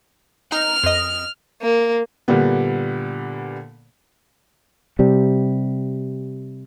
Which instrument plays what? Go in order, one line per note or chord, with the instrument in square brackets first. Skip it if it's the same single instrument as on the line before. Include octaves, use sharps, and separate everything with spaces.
[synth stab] D#4 [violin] F6
[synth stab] F2 D#5
[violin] A#3
[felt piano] A#2 D3 G3 B3
[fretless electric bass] C3 G3